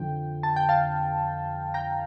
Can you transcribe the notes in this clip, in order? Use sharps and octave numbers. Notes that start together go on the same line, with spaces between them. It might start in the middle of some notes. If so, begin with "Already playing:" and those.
Already playing: F2 D3 F3 G5
A5
G5
F5 A5
G5 A#5